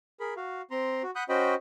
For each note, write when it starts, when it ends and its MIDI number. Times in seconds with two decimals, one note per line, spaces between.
0.20 0.34 68
0.20 0.34 70
0.20 0.34 83
0.37 0.62 66
0.37 0.62 77
0.71 1.03 60
0.71 1.03 82
0.71 1.03 84
1.03 1.11 66
1.15 1.24 78
1.15 1.24 83
1.15 1.24 87
1.15 1.24 90
1.15 1.24 91
1.29 1.55 61
1.29 1.55 66
1.29 1.55 72
1.29 1.55 75
1.29 1.55 79
1.29 1.55 83